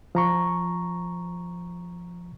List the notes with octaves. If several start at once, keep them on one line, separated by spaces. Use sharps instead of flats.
F3 A#5 C#6